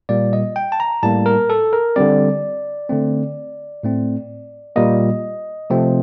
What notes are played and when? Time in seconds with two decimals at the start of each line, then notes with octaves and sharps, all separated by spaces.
0.09 A#2 G3 A#3 D5
0.33 D#5
0.56 G5
0.72 A5
0.80 A#5
1.03 A2 G3 A#3 A5
1.26 A#4
1.50 A4
1.73 A#4
1.96 D3 G3 C4 D5
2.89 D3 A3 C4
3.83 A2 A3 C4
4.76 A#2 G3 A#3 D#5
5.70 C3 F3 A3 C4